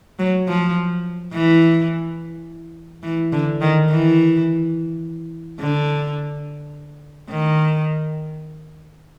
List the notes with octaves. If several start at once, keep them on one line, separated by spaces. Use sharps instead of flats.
F#3
F3
E3
E3
D3
D#3
E3
D3
D#3